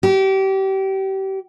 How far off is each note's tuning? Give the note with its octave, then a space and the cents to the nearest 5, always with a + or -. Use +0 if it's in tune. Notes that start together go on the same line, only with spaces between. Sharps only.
G4 -30